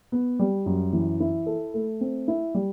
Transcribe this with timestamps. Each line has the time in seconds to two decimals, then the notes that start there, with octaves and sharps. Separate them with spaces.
0.12 B3
0.39 G3
0.66 F#2
0.93 E3
1.20 E4
1.46 A4
1.74 A3
2.01 C4
2.28 E4
2.55 G3